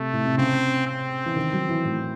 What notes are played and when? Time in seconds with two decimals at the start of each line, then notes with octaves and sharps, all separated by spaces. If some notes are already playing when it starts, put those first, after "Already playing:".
Already playing: C3 A3
0.13 A2
0.26 C3
0.38 C#3 C4
0.87 C4
1.26 E3
1.36 D#3
1.53 F#3
1.69 E3
1.85 A2